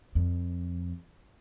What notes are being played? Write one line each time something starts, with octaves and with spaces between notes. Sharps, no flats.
F2